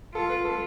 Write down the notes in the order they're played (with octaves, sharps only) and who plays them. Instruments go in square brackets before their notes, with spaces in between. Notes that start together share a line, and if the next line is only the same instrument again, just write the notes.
[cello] F4 [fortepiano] A4
[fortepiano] B4
A4